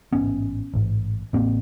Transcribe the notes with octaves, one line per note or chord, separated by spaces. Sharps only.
A1 G#2 B3 C#4
A1 G#2
A1 A2 A#3 C4